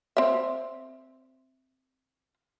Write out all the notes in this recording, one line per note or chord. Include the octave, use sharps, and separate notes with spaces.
C4 E5